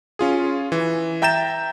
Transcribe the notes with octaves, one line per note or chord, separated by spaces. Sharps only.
C#4 F4 G#4
E3
E5 G5 A#5 G6 A6 E7